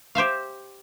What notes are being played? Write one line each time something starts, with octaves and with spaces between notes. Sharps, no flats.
G4 C5 E5 F5